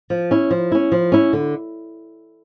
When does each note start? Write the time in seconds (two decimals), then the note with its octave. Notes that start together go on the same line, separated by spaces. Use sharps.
0.10 F3
0.31 C#4 E4
0.51 F3
0.72 C#4 E4
0.92 F3
1.12 C#4 E4
1.33 D3